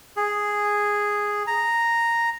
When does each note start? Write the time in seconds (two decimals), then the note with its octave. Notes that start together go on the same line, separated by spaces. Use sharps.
0.17 G#4
1.47 A#5